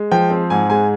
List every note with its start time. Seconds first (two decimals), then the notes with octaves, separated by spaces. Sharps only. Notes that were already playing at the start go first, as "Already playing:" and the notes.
Already playing: G#3
0.11 F3 G5
0.31 C4
0.50 G#2 G#5
0.70 G#3 G#5